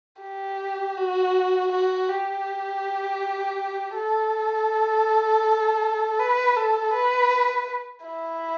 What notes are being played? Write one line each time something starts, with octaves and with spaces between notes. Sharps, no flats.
G4
F#4
F#4
G4
A4
B4
A4
B4
E4